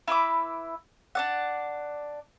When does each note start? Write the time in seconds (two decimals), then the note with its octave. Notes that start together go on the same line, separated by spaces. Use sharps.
0.08 E4 B4 E5 D6
1.15 D4 D5 F#5